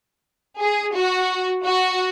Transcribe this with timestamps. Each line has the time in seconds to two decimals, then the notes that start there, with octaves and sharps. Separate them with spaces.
0.59 G#4
0.94 F#4
1.65 F#4